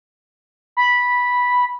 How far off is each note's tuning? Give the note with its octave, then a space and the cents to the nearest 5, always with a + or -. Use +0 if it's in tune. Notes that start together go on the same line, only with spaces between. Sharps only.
B5 -10